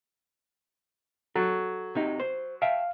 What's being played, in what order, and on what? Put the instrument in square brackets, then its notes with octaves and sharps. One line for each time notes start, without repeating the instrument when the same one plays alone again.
[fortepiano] F#3 [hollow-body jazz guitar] A4
[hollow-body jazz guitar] C3 D#4
C5
[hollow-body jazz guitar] E5 G5 A5 [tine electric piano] F5